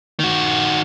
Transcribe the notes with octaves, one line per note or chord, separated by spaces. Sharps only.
D#3 F#4